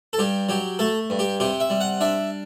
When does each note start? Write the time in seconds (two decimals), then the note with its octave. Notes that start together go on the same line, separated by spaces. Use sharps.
0.13 A4
0.19 G2 G4
0.49 F#3 G4
0.79 A3 A4
1.10 G2
1.19 G4
1.40 C3 G4
1.60 E5
1.70 G3
1.81 F#5
2.01 D4 E5